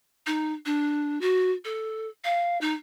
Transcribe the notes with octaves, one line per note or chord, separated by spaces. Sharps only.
D#4
D4
F#4
A4
F5
D#4